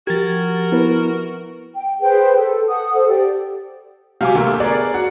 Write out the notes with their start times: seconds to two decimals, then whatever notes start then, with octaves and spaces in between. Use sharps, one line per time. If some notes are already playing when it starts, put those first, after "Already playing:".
0.07 F3 F#4 G4 A#4 G#6 A6
0.72 B3 E4 B4
1.74 G5
2.01 G#4 B4 C5 G5
2.37 A4
2.68 F#5 D#6
2.94 A4 C5
3.09 G4 D5
4.21 C3 F#3 F5 G#5 D6
4.35 D2 A3 A#3 G4
4.60 B3 G#4 A#4 D5
4.94 F#4 F#5